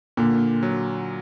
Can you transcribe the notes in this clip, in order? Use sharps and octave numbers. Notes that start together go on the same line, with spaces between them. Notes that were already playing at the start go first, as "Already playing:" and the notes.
A#2 D3
F#3